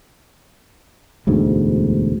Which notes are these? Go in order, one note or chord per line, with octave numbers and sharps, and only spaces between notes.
E1 D2 G#2